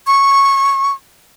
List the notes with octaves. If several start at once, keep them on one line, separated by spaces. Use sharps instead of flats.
C#6